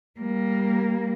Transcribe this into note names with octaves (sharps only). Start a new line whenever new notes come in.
G3 A#3